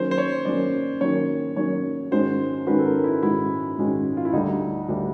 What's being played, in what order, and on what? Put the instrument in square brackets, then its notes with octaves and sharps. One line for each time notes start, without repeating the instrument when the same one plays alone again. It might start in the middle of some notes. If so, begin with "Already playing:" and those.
Already playing: [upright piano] D#3 F#3 A#3 C#4 [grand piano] C5
[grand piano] C5
C#5
[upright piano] D#3 F#3 A#3 C#4 [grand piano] D5
[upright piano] D#3 F#3 A#3 C#4 [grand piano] C#5
[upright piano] D#3 F#3 A#3 C#4 [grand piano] C#5
[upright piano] G#2 D#3 G#3 C#4 F#4 [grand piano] C5
[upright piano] G#2 D#3 G#3 C#4 F#4 [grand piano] B4
[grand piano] A4
A#4
E4
[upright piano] G#2 D#3 G#3 C#4 F#4 [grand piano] E4
[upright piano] G#2 D#3 G#3 C#4 F#4
[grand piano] F4
E4
[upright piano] D2 D3 G3 [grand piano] D#4
[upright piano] D2 D3 G3